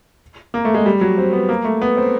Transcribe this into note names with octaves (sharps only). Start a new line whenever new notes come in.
A#3
A3
G#3
G3
F#3
C4
B3
A#3
A3
B3
C4